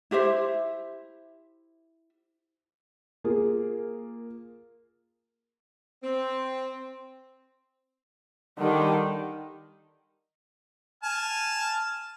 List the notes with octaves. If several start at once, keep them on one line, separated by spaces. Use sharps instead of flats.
E4 G4 C5 E5
A#3 F4 G#4
C4
D3 D#3 G3
G#5 A5 F6